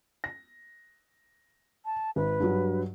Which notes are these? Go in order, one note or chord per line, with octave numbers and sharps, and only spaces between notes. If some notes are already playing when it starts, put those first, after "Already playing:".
A#6
A5
G#1 B4
G2 F#3